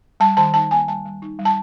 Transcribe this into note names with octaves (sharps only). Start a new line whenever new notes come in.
G3 A5
D#3 A5
D#4 A5
A#3 G#5
G3 A5
G3
D#4
G3
A5